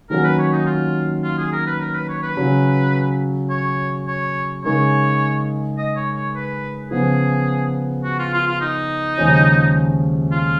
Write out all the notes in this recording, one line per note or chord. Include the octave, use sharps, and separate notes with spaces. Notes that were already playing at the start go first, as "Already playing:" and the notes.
D#3 F#3 A#3 C#4 F#4 A#4
B4
C#5
D#4
F4
F4
G#4
A#4
B4
A#4
B4
C#5
B4
C#3 F#3 C#4
C#5
C#5
C#3 G#3 D#4 A#4 C#5
D#5
C#5
C#5
B4
C#3 F3 B3 G#4
F#4
F4
F4
F4
D#4
D#2 C#3 F3 G#3 C#4
F4